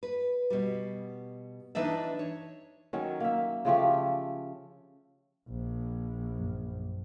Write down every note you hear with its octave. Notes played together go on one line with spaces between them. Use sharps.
B4
B2 G3
E3 D4 D#4 D5 E5
C#5
D#3 F#3 C#4
A#3 E5
C#3 F3 A3 G4
A#1
F#2